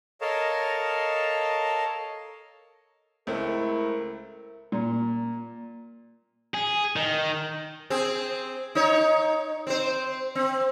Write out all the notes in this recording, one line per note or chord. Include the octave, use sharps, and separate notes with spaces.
A4 A#4 C#5 D#5 F5 A5
C#2 A3 C4 E4 A#4
A#2
G#4
D#3
C4 G#4
D#4 C#5
C4 C5
C4